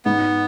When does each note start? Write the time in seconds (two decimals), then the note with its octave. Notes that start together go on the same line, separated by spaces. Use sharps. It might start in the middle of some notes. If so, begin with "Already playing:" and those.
0.05 G#2 B3